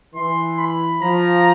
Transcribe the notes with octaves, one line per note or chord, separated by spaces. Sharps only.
E3 C6
B5
F3 A#5